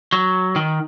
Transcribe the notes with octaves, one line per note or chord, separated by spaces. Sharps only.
F#3
D#3